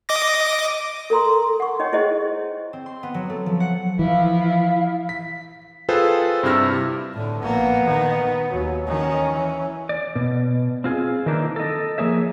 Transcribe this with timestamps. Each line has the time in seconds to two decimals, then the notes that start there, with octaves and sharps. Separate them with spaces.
0.09 D#5 D6 A#6
1.10 A4 A#4 A#5 C6
1.60 F#5 C#6
1.80 D#4 C#5 D#5 G5
1.93 E4 G#4 C5 D#5
2.73 C4
2.86 C6
3.03 B3
3.14 F#3
3.30 A3
3.46 F3
3.60 F#5
3.99 E3 F3 E4 F5
5.09 B6
5.89 F4 G#4 A4 B4 C5 G5
6.43 G2 C3 E4 E6 F6 A#6
7.13 A2 D3
7.42 A#1 A#3 B3
7.85 D#3
8.53 D#2 F#3
8.87 D#3 C#4
9.32 E3
9.89 D5
10.16 B2
10.84 C4 F4 G#4
11.26 D#3 E3 A#3 D4 D#4
11.56 A4 D#5
11.98 F3 A#3 G#4 C#5 E5